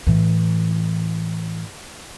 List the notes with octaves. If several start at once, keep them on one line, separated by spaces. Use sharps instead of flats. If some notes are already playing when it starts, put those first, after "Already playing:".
A2 E3